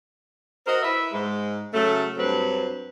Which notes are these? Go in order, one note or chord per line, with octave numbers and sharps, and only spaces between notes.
F#4 A#4 C5 D#5
E4 B4 E5
G#2 G#3
C#3 F#3 A3
G2 F#3 C4 B4